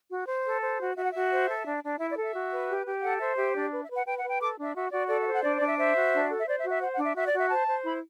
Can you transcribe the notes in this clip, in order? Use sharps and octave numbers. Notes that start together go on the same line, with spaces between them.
F#4
C5
A4
C5
F#4
F#4 E5
F#5
F#4 E5
C5
A4
D4
D4
E4 E5
D5
A4
E5
F#4
B4
G4
G4
A4 F#5
C5 E5
G4 E5
D4 D5
B4
E5
B4
F#5
B4 G5
F#5
B4
G5
A4 D6
D4
E5
F#4 E5
F#4 D5
A4 D5
E5
C5
F#5
D4 D5
D5
D4
E5
C5 E5
F#4
D4
A4
E5
C5 D5
E5
F#4
E5
C5 F#5
F#5
D4
E5
F#4 E5
D5
F#4
E5
C5 A5
C5
E4 B5